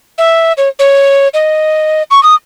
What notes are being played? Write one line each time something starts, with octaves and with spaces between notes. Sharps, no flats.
E5
C#5
C#5
D#5
C#6
D#6